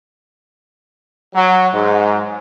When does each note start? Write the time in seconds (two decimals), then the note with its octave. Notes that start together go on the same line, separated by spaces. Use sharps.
1.35 F#3
1.73 G#2